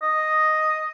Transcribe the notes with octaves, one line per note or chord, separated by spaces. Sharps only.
D#5